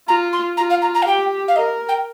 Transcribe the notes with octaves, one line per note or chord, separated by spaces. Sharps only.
F4 A#5
C6
F4 A#5
F5
A#5
A#5
F5
G4 G5
F5
A#4 D#5
G5